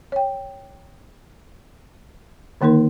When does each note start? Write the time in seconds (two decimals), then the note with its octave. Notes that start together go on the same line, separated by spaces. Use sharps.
0.12 C#5 G5
2.61 D3 D#3 A#3 D#4 A#4